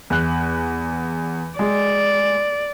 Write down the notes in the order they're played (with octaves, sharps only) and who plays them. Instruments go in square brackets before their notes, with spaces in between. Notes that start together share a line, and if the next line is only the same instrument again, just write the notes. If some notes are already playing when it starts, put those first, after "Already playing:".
[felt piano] E2 F#6
[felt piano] G#3 [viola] D5